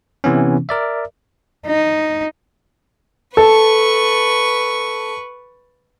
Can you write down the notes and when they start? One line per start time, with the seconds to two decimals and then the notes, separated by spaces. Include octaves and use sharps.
0.24 C3 E3 B3 C#4
0.69 A#4 D5 E5
1.66 D#4
3.37 A4 B4 C#6